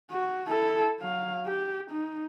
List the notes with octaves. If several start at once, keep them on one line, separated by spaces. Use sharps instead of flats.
F#4
E4 A4
F#3 F5
G4
D#4